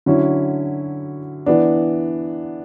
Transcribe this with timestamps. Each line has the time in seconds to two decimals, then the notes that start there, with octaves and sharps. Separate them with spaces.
0.06 D3 F#3 C#4 E4
1.46 E3 B3 D4